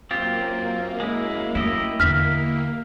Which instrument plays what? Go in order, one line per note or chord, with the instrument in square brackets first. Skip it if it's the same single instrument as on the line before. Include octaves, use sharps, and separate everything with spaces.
[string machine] F#2 A#3 [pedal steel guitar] C4 F4 G4
[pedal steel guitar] G#3 E4
[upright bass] A3 [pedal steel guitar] E4 G4 D#5
[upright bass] E2 D3 [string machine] A#3 [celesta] F6 B6